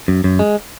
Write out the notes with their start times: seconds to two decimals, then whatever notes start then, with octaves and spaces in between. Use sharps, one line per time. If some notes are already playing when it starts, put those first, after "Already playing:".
0.08 F#2
0.24 F#2
0.39 G#3